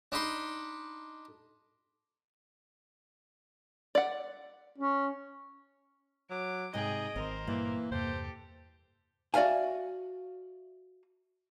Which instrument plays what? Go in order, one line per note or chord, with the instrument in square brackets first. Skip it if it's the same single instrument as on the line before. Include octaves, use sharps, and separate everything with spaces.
[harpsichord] D4 D#4 B5 C6
[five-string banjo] D5 F#5
[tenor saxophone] C#4
[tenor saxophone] F#3 [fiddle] D6
[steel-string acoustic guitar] G#2 C3 [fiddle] G#4 G5 [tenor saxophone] D#5
[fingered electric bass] G#1 D#3 [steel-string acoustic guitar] C4 [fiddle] A#4 C5
[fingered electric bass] G2 A#2 G3 [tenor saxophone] E3 [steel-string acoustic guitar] A#3
[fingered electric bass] E2 G2 C3 [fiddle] G4 A4 [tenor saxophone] C5
[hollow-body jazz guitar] F#4 D5 E5 F5 G#5